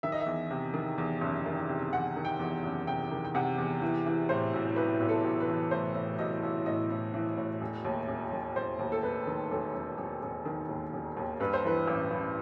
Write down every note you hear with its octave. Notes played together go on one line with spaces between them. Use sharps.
D#3 E5
D#5
E5
E2
C3
D#3
E2
F#1
D#3
C3
E2 F#5
D#3
G5
E2
F#1
C3 G5
D#3
G5
C3 F#5
E2
E3
E3
A2 C5
B1
B1 B4
B1
A4
B1
B4
E3
A2 C5
A2
B1 D#5
B1
A2 D#5
A2
E3
A2
E1
D#2
E1
E1
E1 C5
D#2
A4
E1 B4
D#3
E1 A4
E1
E1
E1
D#3
D#2
E1
D#2
G2 B4
C5
E3 B4
A1
A1